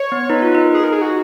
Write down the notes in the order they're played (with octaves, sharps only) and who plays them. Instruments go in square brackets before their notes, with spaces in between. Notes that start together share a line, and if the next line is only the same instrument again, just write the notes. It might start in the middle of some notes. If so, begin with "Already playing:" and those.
Already playing: [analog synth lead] C#5
[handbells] B3
[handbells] D#4 [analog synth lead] B4
[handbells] F4
D#4
[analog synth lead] A#4
G#4
A#4
G#4
F#4